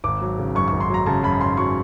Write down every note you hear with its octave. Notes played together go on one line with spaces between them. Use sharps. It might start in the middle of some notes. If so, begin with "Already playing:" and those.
G#1 D6
F#3
C#3
F#2 C#6
C#6
G#1
C6
F#3 A#5
C#3 A5
F#2 B5
G#1 C6
F#3 C#6